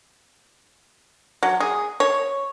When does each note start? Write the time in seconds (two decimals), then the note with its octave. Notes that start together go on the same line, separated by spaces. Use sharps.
1.43 F#3
1.60 G#4
2.00 C#5